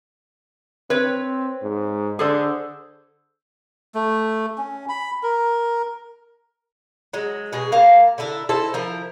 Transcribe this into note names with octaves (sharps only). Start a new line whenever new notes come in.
C4 B4 C#5
G#2
D3 G#4 A4 C5
A3
C#4
B5
A#4
F#3 G#3
B2 G#3 G#4
A#3 A#4 F5 A5
D3 E4 A4 A#4
D#4 E4 A4 C5
F3 E4 A#4